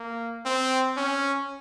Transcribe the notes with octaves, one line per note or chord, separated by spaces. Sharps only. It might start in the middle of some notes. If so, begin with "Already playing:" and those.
Already playing: A#3
C4
C#4